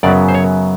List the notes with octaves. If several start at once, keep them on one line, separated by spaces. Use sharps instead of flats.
F#2 C#3 F#3 B3 D5
C5
C#5